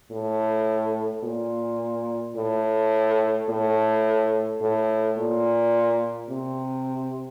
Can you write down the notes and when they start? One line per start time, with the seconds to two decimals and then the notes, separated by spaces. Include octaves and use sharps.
0.12 A2
1.24 A#2
2.37 A2
3.49 A2
4.61 A2
5.18 A#2
6.30 C3